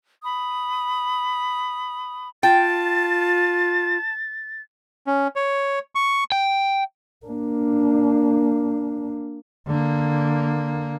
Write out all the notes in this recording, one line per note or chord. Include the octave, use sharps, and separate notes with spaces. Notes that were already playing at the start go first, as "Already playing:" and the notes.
B5 D#6
F4 G5 A5 A6
C#4
C#5
C#6
G5
A#3 D4
D3 A#3